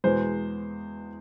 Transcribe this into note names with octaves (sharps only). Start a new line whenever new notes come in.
E2 B2 G#3 B3 C5